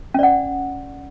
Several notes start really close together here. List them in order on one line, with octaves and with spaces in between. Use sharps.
C#4 D5 F#5